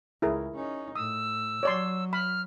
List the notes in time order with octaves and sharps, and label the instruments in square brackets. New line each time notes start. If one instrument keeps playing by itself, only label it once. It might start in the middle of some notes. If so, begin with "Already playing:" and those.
[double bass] C#2 [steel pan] E4 G#4 A#4
[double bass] C#4 D#4
[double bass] A2 [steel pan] D#6 [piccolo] E6
[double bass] F#3 [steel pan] C#5 D5 C6
[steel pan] B5 [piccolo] F6